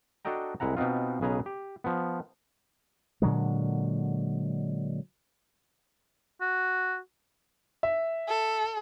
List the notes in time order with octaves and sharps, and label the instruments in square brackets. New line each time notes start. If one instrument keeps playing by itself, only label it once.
[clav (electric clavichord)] D4 F#4 A4 D#5 G5 A#5
C2 G#3 E4 F#5 A#5
B2 B3 C4 D#4 F4
B1 C#3 G#4 B4 G#5 A#5
G4
F3 B3
[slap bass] A#2 D3 F#3 G#3
[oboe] F#4
[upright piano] E5
[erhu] A4